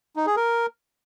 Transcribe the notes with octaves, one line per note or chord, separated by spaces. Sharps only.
D#4
G#4
A#4